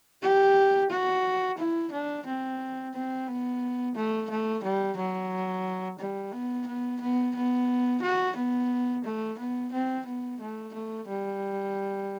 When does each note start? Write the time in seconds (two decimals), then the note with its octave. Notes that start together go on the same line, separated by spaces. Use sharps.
0.22 G4
0.90 F#4
1.58 E4
1.92 D4
2.26 C4
2.94 C4
3.28 B3
3.95 A3
4.30 A3
4.64 G3
4.97 F#3
5.99 G3
6.33 B3
6.67 B3
7.01 B3
7.35 B3
8.02 F#4
8.36 B3
9.04 A3
9.39 B3
9.72 C4
10.06 B3
10.41 A3
10.74 A3
11.08 G3